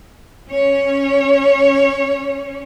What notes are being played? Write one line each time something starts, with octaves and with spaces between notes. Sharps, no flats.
C#4 C#5